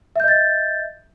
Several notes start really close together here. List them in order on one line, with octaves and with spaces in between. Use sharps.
E5 G6 D#5 A6